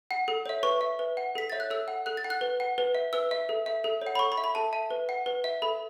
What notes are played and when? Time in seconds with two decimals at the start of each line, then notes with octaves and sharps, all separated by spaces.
0.11 F#5
0.28 A4
0.46 C#5 E5
0.63 B4 C#6
0.81 E5
0.99 B4
1.17 F#5
1.35 A4 B6
1.50 C#5 E5 A6
1.60 F#6
1.70 A4 E6
1.88 F#5
2.06 A4 F#6
2.17 A6
2.24 F#5
2.30 F#6
2.41 B4
2.60 F#5
2.78 B4
2.95 E5
3.13 B4 E6
3.31 E5
3.49 A4
3.66 E5
3.84 A4
4.01 C#5
4.07 F#5
4.15 B5
4.19 A4 C#6
4.32 B5
4.38 E5
4.44 B5
4.55 A4 A5
4.73 E5 A5
4.91 B4
5.09 F#5
5.26 B4
5.44 E5
5.62 A4 B5